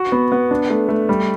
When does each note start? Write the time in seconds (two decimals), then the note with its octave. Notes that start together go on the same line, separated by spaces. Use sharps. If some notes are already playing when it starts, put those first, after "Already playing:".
Already playing: F#4
0.12 B3
0.32 B3
0.51 D4
0.70 A3
0.89 A3
1.09 G3